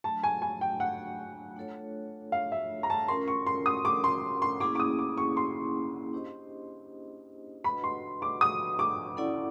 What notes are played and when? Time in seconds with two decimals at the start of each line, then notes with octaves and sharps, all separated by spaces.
0.04 F#3 A3 D4 A5
0.24 G#5
0.42 G#5
0.61 G5
0.80 F#5
1.56 A3 D4 F4 A4 C#5
2.32 F5
2.52 E5
2.83 A#5
2.90 A5
3.08 C#4 F4 A#4 C6
3.28 C#6
3.46 C6
3.66 D#6
3.85 D6
4.04 C6
4.42 C6
4.60 A#3 C#4 E4 G#4 D6
4.75 D6
4.80 D#6
4.99 D6
5.17 C#6
5.37 C6
6.13 D4 G4 C5 D#5
7.64 D4 F#4 B4 D#5 F#5 B5
7.84 C6
8.22 D6
8.41 D#6
8.79 D6
9.17 C#4 E4 A4 D5 F#5